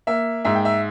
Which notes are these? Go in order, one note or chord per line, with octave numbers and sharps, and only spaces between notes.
A#3 E5
G#2 E5
G5
E5